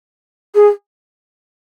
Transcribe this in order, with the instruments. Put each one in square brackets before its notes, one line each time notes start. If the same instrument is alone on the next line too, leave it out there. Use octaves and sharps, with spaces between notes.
[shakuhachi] G#4